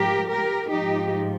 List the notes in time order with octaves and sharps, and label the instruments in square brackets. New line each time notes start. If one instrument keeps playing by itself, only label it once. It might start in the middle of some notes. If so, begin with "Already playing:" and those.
Already playing: [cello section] G#2 F3 G4 A#4
G4 A#4
G#2 F3 D#4 G4